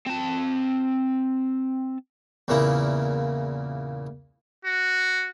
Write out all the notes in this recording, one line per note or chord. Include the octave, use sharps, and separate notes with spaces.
C4 A5
E2 A#2 C#3 A#3 E4
F#4